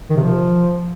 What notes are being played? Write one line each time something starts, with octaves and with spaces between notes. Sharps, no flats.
D#3
C3
F3